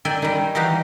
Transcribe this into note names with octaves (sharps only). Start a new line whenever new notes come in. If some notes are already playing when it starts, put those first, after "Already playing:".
D#3 D5 E5 G5 G#5
D#3 G3
E3 D#4 F#4 G4 F5